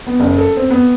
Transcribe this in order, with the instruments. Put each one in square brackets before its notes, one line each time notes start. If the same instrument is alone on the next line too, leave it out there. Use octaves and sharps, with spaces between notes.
[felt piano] B3
F#1
A4
C4
B3